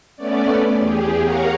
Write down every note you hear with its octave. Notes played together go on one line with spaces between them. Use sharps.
A3 B3 C#4 D5
E2 G4 G#4
A#4 C#5 F5 F#5 A#5